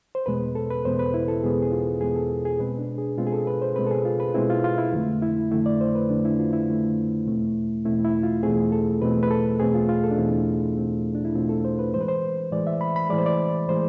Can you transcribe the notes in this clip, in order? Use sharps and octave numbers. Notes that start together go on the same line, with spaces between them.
C5
E2 B2 G#3 B3 B4
A4
B4
E2 B2 G#3 B3 C5
B4
E4
A4
E2 B2 G#3 B3 G#4
G#4
F4
E2 B2 G#3 B3 G#4
A4
G#4
B2 G#3 C4 B4
D4
G#4
B2 G#3 C4 F4
G#4
A4
B4
C5
B2 G#3 C4 B4
A4
G#4
F4
B4
B2 G#3 C4 E4
F4
F4
E4
F2 D3 A3
E4
F2 D3 A3 E4
D5
C5
B4
F2 D3 A3 D4
E4
F4
E4
F2 D3 A3
E2 B2 A3 C4
E2 B2 A3 C4 E4
E4
F4
E2 B2 A3 C4 G#4
A4
E2 B2 A3 C4 B4
B4
A4
E2 B2 A3 C4 G#4
F4
F4
A4
D4
E2 B2 A3 C4 E4
E2 B2 A3 C4
D4
E4
E2 B2 A3 C4 F4
A4
C5
B4
A2 E3 G#3 C5
B4
C5
A2 E3 G#3 D5
E5
B5
B5
A2 E3 G#3 D5
C5
D5
A2 E3 G#3 C5